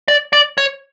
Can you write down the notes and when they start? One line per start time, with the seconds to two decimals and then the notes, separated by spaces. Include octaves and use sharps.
0.08 D5
0.33 D5
0.58 C#5